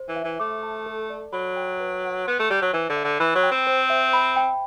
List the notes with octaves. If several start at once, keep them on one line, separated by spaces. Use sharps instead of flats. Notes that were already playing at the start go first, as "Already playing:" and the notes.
Already playing: C5
E3
E5
E3
A3 D6
A5
A4
D5
F#3 B5
G5
B4
F#5
B3 C6
A3
G3 A5
F#3
E3 C5
D3
E5
D3
E3 B5
F#3
G5
C4
C5
E5
B5
G5